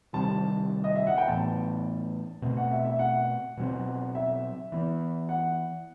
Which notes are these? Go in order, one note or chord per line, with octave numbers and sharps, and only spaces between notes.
C3 D#3 G3 C4 A5
D#5
E5
F#5
G5
A2 E3 B3 A5
B2 A3 C4
F#5
E5
E5
F#5
B2 F#3 C4
E5
E3 B3
F#5